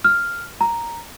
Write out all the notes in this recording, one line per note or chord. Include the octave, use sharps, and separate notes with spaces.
F6
A#5